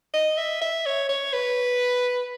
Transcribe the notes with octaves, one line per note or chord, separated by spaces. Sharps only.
D#5
E5
E5
C#5
C#5
B4